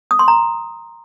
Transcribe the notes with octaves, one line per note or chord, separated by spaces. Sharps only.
D#6
C6
A#5